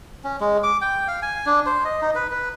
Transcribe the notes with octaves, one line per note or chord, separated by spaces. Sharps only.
C#4
G#3
D6
G5
F5
G#5
D4
C5
D#5
D#4
B4
B4